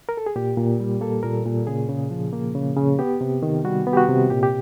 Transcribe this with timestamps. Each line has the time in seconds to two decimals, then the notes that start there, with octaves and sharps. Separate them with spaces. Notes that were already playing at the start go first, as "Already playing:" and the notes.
0.09 A#4
0.17 A4
0.26 G#4
0.36 A#2 G4
0.57 A#2
0.80 G3
1.01 A#3 A4
1.23 A#2 A#4
1.45 A#2
1.67 C#3 G#4
1.89 C#3
2.11 F3
2.32 A#3
2.55 C#3
2.77 C#3
2.99 B3 G4
3.21 C3
3.43 D#3
3.65 G3 F#4
3.87 B3
3.93 G4
3.97 F#4
4.08 C3
4.30 A#2 G4
4.43 G4